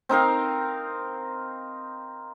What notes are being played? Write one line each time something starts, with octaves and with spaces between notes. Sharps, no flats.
C4 D#4 A#4 F5